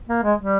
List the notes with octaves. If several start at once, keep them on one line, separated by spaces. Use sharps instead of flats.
A#3
G#3
G3